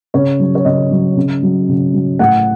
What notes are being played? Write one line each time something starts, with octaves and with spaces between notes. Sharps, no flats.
C#3 C#5
F#3
C#5
C#3 D#5
F#3
C#3
F#3
C#3
F#3
A2 F#5